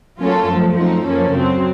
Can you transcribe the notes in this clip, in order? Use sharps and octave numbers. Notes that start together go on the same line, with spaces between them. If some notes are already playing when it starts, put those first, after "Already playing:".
F#3 A#3 C#4 F4 A4
F#2 F3 A3
F#2 F3 A3 C4 D#4
F#2 F3 A#3 C#4 A4
F#2 C#3 F#3 C4